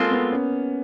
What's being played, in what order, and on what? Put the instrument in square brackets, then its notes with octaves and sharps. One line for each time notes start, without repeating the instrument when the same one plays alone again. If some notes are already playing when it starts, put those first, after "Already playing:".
Already playing: [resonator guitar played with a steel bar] G#3 C4 F4 A4 [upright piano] A#3
[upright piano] B3
C#4